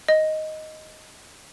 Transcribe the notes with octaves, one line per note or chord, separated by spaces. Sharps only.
D#5